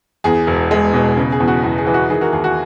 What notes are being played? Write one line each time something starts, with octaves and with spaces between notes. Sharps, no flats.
E2 G#4
E1
G#3
B2
C#3
G#4
E2
F#4
E2
G#4
E3
F#4
D#3 G#4
F#4 A#4
D#2 G#4
F#4